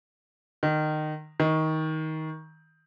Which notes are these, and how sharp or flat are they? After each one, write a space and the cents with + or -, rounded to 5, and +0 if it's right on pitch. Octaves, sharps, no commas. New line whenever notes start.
D#3 -20
D#3 +20